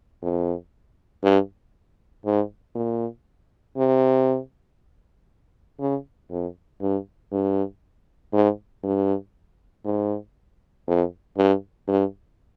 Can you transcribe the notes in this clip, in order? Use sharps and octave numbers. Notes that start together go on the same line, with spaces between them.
F2
G2
G#2
A#2
C3
C#3
F2
G2
G2
G#2
G2
G#2
F2
G2
G2